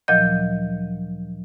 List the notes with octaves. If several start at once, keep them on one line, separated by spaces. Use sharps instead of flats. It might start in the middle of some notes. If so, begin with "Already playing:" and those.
D2 A#2 F3 F#3 D#5 G6